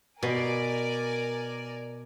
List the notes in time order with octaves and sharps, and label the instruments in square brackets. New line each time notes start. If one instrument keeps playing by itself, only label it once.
[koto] B2 [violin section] A#4 D5 G#5